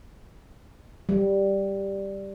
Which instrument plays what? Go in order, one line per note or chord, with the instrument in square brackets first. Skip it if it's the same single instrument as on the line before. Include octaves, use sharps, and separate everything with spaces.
[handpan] G3